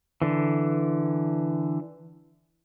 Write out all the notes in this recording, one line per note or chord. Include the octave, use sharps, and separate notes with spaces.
D3 E3